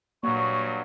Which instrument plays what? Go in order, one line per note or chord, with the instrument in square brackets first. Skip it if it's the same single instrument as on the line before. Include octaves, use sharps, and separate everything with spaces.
[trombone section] G2 F#3 [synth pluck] A#2 A#3 [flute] C#6